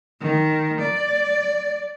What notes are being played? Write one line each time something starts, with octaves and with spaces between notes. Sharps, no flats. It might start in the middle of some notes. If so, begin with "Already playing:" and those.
D#3
D5